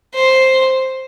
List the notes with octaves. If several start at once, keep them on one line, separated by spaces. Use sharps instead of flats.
C5